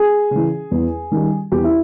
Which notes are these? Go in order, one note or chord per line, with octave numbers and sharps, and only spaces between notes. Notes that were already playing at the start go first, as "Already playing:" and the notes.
Already playing: G#4
C#3 E3
E2
D#3 G3
E2 G4
E4